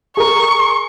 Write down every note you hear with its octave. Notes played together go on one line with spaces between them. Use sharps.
G#4 A#4 C#6